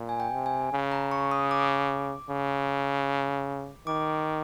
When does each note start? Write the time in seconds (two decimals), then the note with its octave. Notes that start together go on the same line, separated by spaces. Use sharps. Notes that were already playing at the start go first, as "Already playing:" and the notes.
Already playing: A#2
0.09 G#5
0.20 G5
0.33 C3
0.46 G#5
0.73 C#3
0.92 A#5
1.11 C#6
1.31 D#6
1.51 D6
2.30 C#3
3.87 D#3 D6